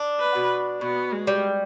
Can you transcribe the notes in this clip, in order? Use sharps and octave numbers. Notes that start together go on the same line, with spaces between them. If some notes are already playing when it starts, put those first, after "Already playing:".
Already playing: D4
B4
B2
B2 B3
G#3
G3